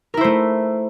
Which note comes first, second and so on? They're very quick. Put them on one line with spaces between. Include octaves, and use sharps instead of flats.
A#4 E4 C5 A3